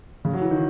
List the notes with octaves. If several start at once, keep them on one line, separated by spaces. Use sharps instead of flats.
C#3
F#3
E3
D#3